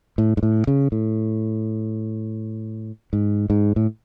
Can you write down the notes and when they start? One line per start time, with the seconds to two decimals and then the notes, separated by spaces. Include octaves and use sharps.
0.18 A2
0.37 G#2
0.43 A2
0.67 C#3
0.92 A2
3.13 G#2
3.50 G#2
3.76 A2